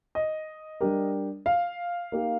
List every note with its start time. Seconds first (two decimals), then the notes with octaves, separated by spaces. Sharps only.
0.15 D#5
0.81 G3 D4 G4 A#4
1.46 F5
2.12 A#3 D#4 G4